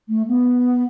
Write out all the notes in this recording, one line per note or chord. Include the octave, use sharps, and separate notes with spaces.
A3
B3